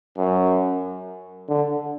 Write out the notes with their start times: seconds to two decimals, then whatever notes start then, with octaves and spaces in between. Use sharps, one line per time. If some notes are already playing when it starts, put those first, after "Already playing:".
0.18 F#2
1.49 D3